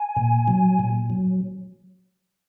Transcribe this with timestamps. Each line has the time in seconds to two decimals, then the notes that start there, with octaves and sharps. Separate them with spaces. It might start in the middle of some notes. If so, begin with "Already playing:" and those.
Already playing: G#5
0.17 A#2
0.48 F#3
0.79 A#2
1.10 F#3